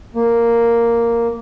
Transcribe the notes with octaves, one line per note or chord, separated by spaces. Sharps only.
A#3